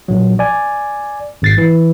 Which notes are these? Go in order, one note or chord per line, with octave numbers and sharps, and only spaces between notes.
A#1 F#3
D5 G#5
G#1 A6 C7
E3